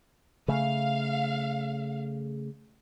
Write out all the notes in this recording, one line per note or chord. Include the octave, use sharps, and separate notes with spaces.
C#3 A3 F5